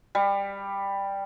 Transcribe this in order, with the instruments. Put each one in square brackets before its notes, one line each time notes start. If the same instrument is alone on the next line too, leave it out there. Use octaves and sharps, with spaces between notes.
[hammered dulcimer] G3